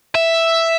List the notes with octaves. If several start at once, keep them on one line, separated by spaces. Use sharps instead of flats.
E5